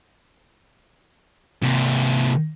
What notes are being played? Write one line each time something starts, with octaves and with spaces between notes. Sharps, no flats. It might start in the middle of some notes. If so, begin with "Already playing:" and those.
C3 A#3